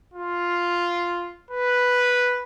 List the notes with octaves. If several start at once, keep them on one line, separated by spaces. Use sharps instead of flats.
F4
B4